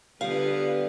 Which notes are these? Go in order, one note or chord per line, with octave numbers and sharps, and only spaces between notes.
D3 G3 B3 F4 G4 B4 D5 F5